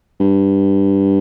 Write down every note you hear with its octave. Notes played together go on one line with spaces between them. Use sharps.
G2